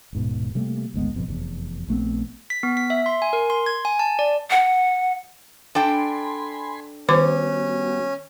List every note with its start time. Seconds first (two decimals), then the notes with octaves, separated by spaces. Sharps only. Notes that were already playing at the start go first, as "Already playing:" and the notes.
0.13 D#1 G#2 B2
0.55 C3 G3 A3 A#3
0.94 G#1 D2 G#3 B3
1.14 G1 F2 B2
1.28 F1 E2
1.88 A#1 A3 B3 C4
2.50 B6
2.63 B3
2.77 B6
2.90 E5
3.06 C6
3.22 G#5
3.33 A#4
3.50 C6
3.66 G#6
3.85 G#5
3.99 A5
4.19 D5
4.50 F#5
5.75 D4 A4 G5 G#5 B5 C6
7.09 D#3 G3 B3 C#4 F#4 C5 D6